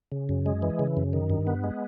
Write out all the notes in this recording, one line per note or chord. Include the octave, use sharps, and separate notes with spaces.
C#3
F#2
G#3
E3
C#3
F#2
D#3
G2
B3
G#3